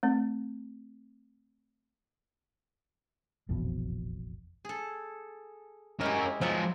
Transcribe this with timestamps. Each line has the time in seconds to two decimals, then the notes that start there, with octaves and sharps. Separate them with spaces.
0.03 A3 C4
3.49 F1 A#1 E2 B2
4.65 G#4 A4
6.01 G#3 C#4 E4 G4 A#4
6.41 F3 F#3 G#3 E5 F#5